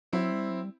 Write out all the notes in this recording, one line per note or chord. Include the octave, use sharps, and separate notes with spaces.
F#3 C4 E4
G3
F#3
G3